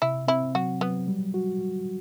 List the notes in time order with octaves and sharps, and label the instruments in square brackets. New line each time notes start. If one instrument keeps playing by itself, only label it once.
[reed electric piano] C3 [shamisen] E4
[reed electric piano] C4 [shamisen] E4
[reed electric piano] F#3 [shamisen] F#4
[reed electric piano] F#3 [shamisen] B3
[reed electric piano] G3
F#4
F#4